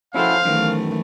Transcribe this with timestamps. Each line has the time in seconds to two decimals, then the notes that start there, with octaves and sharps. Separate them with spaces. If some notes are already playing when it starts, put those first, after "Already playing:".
0.14 F3 C#4 E4 F#4 A4 C5 F5
0.45 F#2 D#3 E3 A3